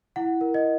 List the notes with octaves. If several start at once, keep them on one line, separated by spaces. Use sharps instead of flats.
E4 F#5
A#4
D#5